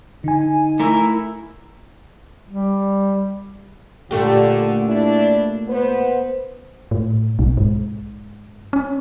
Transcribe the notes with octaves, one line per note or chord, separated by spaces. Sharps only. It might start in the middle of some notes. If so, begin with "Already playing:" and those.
D3 D#4 G#5
A3 E4 A#4
G3
A#2 D3 A3 G4
D4 E4
B3 B4 C5
A2
B1
G#2
C#4